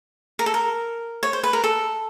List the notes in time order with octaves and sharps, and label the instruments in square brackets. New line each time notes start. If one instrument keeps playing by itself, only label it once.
[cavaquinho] A#4
A4
A#4
C#5
C5
B4
A#4
A4